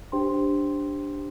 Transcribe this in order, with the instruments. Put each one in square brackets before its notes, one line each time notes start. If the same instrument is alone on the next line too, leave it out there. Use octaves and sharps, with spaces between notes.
[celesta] D4 G4 C5 G5 C6